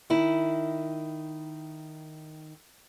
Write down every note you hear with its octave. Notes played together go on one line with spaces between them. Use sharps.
D#3 E4